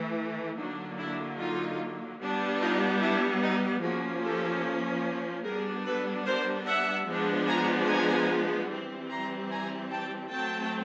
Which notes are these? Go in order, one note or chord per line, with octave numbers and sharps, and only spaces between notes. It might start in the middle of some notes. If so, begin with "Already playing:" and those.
Already playing: E3 A3
D3 F#3 A#3 D4 D#4
D4 E4
D#4 F4
G3 B3 D4
D#4 F4
D4 E4
D#4
F3 A#3 C#4 F#4 G#4
G4 A4
G3 B3 D4 G#4 A#4
A4 B4
A#4 C5
E5 F#5
F3 G#3 B3 D4
G#5 A#5
G#5 A#5
E3 G3 C4
A#5 C6
G#5 A#5
G5 A5
F#3 A3 C4 G5 A5